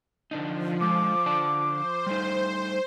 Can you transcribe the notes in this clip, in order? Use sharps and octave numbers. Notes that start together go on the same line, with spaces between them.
D3 F3 D4 D#4
D3 G#3 A4 D6
D3 D5 A5
C5
G3 A3 D#4